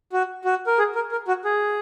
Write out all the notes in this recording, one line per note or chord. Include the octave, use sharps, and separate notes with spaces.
F#4
F#4
A#4
G#4
A#4
A#4
F#4
G#4